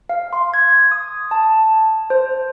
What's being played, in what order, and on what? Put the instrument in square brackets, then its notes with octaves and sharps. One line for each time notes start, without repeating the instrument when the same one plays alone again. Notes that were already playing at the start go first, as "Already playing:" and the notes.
[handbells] F5
C6
G#6
D#6
A5
C5